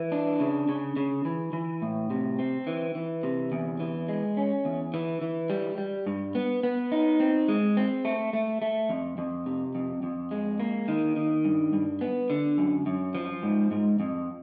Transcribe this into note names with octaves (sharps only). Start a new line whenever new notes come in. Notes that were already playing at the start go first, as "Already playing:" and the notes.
Already playing: E3
D4
C#3
C#3
C#3
E3
E3
A2
C3
C4
E3
E3
C3
E2
E3
G#3
C#4
E2
E3
E3
G3
G3
G2
B3
B3
D#4
C4
G#3
C4
A3
A3
A3
F2
F2
C3
F2
F2
G#3
A#3
D#3
D#3
G2
G2
B3
D3
F#2
F#2
F3
G#2
G#2
F2